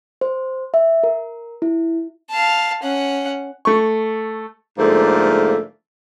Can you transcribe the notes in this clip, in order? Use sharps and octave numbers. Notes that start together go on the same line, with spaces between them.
C5
E5
A#4
E4
F5 A5
C#4 F#5
A3 C#6
G#2 D3 F3 A3 A#3